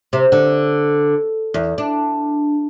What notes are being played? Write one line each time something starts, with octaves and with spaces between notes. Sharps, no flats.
C3
D3
E2
D4